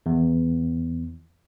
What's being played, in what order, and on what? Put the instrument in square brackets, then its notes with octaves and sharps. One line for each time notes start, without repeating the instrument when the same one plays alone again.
[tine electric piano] E2